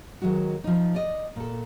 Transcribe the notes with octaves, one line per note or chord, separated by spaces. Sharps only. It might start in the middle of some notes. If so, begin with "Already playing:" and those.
D#3 F#3 G#3 F#4
F3 D#4
D5 D#5
A#2 A4